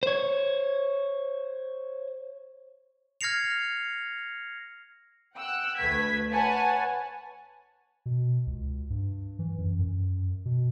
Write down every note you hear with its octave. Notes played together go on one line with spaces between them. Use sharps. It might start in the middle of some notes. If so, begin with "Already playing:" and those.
C5 C#5
F6 G#6 A#6 C7 C#7 F7
F#5 G5 E6 F#6
D2 A3 B4 G#6 B6
B4 C#5 F#5 G#5 A5
B2
C#2
G2
E3
F#2
F#2
B2